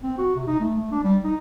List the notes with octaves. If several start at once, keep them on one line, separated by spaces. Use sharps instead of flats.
C4
F#4
C3
D#4
A3
A3
D4
G3
D#4